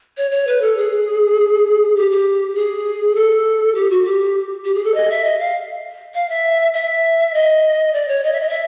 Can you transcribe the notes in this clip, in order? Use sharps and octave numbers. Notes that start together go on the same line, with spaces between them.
C#5
C#5
B4
A4
G#4
G4
G4
G#4
A4
G4
F#4
G4
G4
G#4
A4
D#5
E5
D#5
F5
F5
E5
E5
D#5
D5
C#5
D#5
E5
D#5
E5